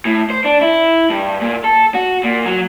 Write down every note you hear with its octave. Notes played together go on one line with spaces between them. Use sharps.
A2
C5
D4
E4
G2
A#2
A4
F#4
A#2
F#3